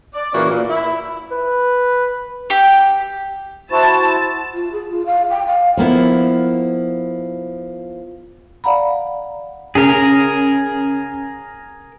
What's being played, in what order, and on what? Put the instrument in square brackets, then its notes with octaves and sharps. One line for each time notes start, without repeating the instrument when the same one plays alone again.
[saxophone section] D5
A#2 C#3 E3 A#3 C#4 F#4
A#2
E4
[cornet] B4
[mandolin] G4
[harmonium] E4 F#4 C5 [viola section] A5
[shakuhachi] F4
G#4
F4
F5
G5
F5
[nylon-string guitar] F3 A#3 B3 E4
[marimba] D5 F5 F#5 A#5 B5
[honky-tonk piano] C#3 [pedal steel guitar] G#4 A#4